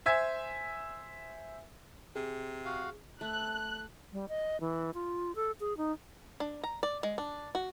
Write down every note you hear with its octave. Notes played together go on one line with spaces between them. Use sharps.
C5 E5 G#5 G#6
C3 G#4
F#4 F5
A3 F#6
G3
D#5
E3
F4
A4
G#4
D#4
D4
A#5
D5
G#3
D4
F#4